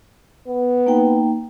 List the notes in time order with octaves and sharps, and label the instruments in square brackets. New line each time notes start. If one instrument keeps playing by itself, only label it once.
[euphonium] B3
[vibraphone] A#3 D#4 G5